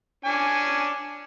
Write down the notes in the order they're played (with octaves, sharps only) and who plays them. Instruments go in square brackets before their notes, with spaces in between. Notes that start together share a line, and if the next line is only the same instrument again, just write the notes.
[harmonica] C#4 D4 G#5